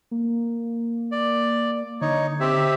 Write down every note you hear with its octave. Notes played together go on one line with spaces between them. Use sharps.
A#3
D5
D3 D#4 C#5
C4 G4 E5